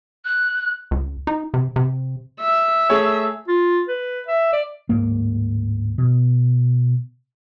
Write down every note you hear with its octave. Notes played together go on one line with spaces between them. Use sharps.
F#6
C#2
D#4
C3
C3
E5
A3 G#4 C#5
F4
B4
E5
D5
D1 G#2 A#3
B2